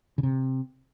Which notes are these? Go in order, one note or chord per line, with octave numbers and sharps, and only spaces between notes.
C#3
C3